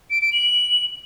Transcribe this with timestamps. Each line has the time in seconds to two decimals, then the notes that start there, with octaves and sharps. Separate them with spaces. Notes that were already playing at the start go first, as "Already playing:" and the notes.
0.10 D7
0.21 D7
0.32 F#7